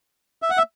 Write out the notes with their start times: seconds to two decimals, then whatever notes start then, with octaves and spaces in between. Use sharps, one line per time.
0.42 E5
0.50 F#5
0.58 E5